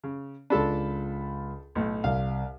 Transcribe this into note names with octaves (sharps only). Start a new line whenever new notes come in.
C#3
C#2 D4 F4 A4 A5 B5
B1 A2
C2 F5